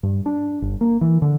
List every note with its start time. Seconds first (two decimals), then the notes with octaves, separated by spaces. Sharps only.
0.03 G2
0.26 D4
0.62 G1
0.81 A#3
1.01 E3
1.22 D3